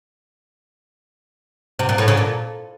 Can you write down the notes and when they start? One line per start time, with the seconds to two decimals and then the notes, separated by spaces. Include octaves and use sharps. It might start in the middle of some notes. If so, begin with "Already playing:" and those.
1.79 C3
1.89 A#2
1.98 A2
2.08 C#3
2.17 A#2